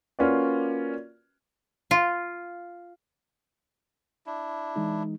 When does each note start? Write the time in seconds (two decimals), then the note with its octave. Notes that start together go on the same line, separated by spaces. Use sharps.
0.19 A#3 C#4 F4 F#4 B4 D5
1.91 F4
4.26 D4 E4
4.76 E3 G#3 D#4